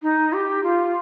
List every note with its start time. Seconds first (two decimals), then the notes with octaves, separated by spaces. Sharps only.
0.03 D#4
0.33 G4
0.63 F4